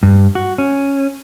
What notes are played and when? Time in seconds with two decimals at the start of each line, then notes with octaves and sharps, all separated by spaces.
0.03 G2
0.35 F#4
0.58 C#4